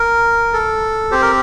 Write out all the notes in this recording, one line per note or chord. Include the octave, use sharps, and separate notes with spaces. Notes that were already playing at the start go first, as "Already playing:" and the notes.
Already playing: A#4
A4
C4 G4 C5
A#4